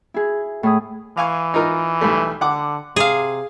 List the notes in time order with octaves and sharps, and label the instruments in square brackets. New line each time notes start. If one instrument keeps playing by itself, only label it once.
[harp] E4 G#4
A2 G#4 D#6
[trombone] E3 [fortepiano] F5 G#5 C#6
[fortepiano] D#4 F4 A#4
B1 G3 A3
[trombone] D3 [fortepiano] F#5 D6
[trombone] C3 [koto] G#4 F5